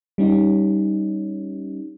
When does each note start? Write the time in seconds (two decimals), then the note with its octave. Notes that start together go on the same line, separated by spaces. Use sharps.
0.18 G3 C#4 D#4